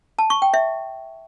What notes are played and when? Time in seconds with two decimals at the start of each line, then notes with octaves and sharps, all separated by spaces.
0.19 A5
0.30 C#6
0.42 G5
0.54 E5